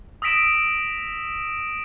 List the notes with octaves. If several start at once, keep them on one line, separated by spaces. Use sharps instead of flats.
D#6 E6 A#6 B6 D7 E7